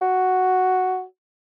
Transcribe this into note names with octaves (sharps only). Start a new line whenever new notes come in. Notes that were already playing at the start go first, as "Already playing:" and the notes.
F#4